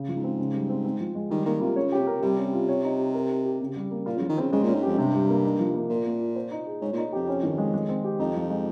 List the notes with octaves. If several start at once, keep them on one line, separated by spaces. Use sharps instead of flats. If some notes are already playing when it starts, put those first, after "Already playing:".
Already playing: C#3
F3
G#2
C4
C#3
G3
C4
C4
F3
G#3
D#3 G3
D#3 A#3
C3 F4
C#3 C#5
C#3 G4
C3
A#4
C3 G3
C#4
F4
C#5
D#4
G4
A#4
D#4
G4
C#3
G3
A#3
A#2 F4
C#3 F3
D#3
C#3 C4
C#3 G#3
A#2 C#4
G#2
F2 G4
G2 C3
G3
A#3
D#4
F3
A#3
A#2 A#4
A#3
F4
C5
D#4
G#4
G#2 C#5
A#2 D#4
F2 G4
C#4
D#3
G#3
G#3
C4
G4
F2 D#4
F3
G#3